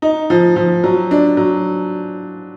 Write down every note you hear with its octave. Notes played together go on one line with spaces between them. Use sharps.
D#4
F3
F3
F#3
D4
F#3